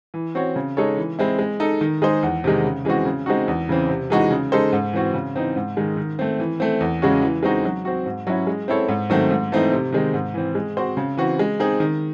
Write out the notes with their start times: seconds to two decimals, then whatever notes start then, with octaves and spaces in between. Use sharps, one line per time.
0.14 E3
0.35 C4 F#4 C#5
0.56 C#3
0.77 G#3 D#4 A4 C#5
0.97 E3
1.19 G#3 C4 E4
1.39 G#3
1.60 D#4 A4
1.81 D#3
2.02 G#3 D#4 G#4 C5
2.23 E2
2.44 C3 D#3 G#3
2.64 C#3
2.85 E3 G#3 C4 F#4
3.05 C#3
3.26 G#3 C4 D#4 F#4
3.48 E2
3.69 C#3 E3 C4
3.89 C3
4.10 E3 G#3 D#4 F#4
4.31 C#3
4.52 G#3 D#4 A4 C5
4.72 G#2
4.93 E3 C4 F#4
5.14 C#3
5.36 E3 C4 D#4
5.56 G#2
5.77 D#3 G#3
5.97 D#3
6.19 A3 C4
6.39 E3
6.60 A3 C4
6.81 E2
7.02 C#3 G#3 C#4 F#4
7.22 E3
7.43 G#3 C4 D#4 F#4
7.64 F#3
7.85 C4 F#4
8.06 G#2
8.27 F#3 C#4 E4
8.47 G#3
8.68 C4 E4 A4 C#5
8.88 G#2
9.10 D#3 F#3 A3 C4
9.30 G#2
9.52 E3 A3 C4 D#4
9.72 C3
9.92 D#3 G#3 C4
10.14 G#2
10.34 E3 C4
10.55 G#3
10.77 C4 F#4 C5
10.97 C#3
11.17 E3 C4 F#4
11.39 G#3
11.60 C4 D#4 G#4
11.80 D#3